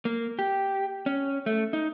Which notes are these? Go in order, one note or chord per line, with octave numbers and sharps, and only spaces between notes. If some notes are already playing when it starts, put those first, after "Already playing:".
A#3
G4
C#4
A3
D#4